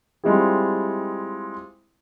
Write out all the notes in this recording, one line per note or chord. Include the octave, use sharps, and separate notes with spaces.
G3 G#3 C4 E4 F4 G#4